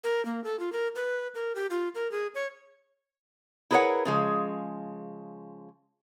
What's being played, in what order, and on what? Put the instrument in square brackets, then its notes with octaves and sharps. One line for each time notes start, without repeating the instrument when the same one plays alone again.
[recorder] A#4
A#3
A4
F4
A#4
B4
A#4
G4
F4
A#4
G#4
C#5
[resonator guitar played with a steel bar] E4 G#4 A#4 B4 C#5 F#5
C#3 F3 G#3